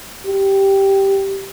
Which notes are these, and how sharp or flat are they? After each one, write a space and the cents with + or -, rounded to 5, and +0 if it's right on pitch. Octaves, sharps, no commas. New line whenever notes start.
G4 -5